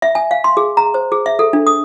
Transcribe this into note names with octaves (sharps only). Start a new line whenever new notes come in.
E5
G#5
F5
C6
G#4
A#5
C5
G#4
E5
A4
D4
D#6